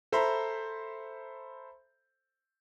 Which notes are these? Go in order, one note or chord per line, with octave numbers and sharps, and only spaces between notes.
A4 C5 E5 A#5 B5